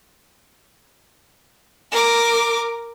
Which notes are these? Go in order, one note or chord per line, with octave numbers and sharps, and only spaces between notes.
A#4 D6